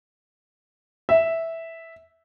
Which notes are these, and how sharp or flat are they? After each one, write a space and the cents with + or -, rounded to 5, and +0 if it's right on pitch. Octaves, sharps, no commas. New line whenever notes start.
E5 -5